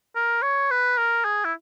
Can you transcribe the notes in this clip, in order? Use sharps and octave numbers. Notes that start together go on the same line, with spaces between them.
A#4
C#5
B4
A#4
G#4
E4